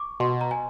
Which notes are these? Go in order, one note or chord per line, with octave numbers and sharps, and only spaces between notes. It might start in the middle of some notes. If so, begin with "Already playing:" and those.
Already playing: C#6 D6
B2 C6
A#5
G#5